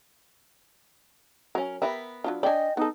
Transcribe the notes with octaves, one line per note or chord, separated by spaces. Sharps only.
F#3 C#4 A#4
B3 G4 A#4 E5
F#3 D4 F4
D4 D5 D#5 G5 G#5
B3 D#4 A4